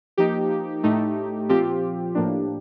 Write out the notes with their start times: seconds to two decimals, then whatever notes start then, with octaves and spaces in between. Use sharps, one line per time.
0.17 F3 A#3 D#4 G4
0.83 A2 A3 D#4
1.49 A#2 F3 C4 F4 G4
2.15 A2 F3 A#3 D4